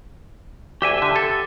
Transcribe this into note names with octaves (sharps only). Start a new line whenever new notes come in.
D2 G4 E5 G#5
D3
A4